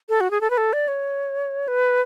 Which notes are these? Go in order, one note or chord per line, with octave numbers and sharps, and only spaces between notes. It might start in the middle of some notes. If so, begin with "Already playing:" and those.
A4
F#4
G#4
A4
B4
A4
D5
C#5
B4